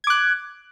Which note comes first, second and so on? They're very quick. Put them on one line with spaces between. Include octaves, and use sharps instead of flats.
G#6 D6 F#6